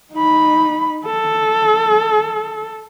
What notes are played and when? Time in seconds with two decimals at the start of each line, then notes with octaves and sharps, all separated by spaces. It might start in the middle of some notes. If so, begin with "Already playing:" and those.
0.14 D#4 B5
1.06 A4